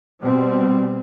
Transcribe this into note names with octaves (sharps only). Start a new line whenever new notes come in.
B2 G3 C4